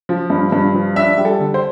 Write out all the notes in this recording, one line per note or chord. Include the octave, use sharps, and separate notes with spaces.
F3
G2
G2
F3
D4 E5
G3
A4
D3
C5